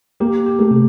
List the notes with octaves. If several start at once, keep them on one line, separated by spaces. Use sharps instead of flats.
A#3 G4
G4
A3
C3